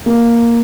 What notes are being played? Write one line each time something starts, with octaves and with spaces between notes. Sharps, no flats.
A#3